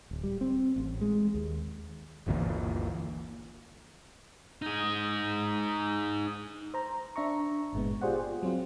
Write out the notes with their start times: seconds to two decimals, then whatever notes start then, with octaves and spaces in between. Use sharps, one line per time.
0.11 D1
0.23 G3
0.41 C4
0.76 A1
1.01 G#3
1.34 D#2
2.27 G1 D2 A#2 E3
4.62 D#4 G#4
6.74 C5 A#5
7.16 D4 E5 A#5 C#6
7.73 G1 A#2 G#3 B3
8.01 F4 G4 G#4 C5 D5 F#5
8.16 G#4
8.43 F#3 C4 F4